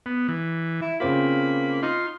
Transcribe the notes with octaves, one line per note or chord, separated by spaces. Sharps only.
B3
E3
E4
C#3 A#3 C4 F4 B5
D#4 F4 C6